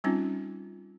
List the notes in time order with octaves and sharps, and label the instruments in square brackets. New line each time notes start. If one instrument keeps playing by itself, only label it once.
[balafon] G3 C4 C#4 D#4 F4